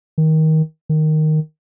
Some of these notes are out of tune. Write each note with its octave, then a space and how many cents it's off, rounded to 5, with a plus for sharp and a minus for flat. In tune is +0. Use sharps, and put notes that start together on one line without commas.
D#3 +20
D#3 -5